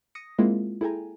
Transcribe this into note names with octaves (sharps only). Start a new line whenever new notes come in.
D#6 A#6 C#7
G#3 A#3 C4 E4 F4
E4 G#4 A4 G5 G#5 A#5